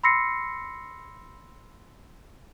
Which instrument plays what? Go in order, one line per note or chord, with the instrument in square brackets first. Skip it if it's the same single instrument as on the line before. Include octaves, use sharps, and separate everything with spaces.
[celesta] B5 C6 E6 A#6 C7 C#7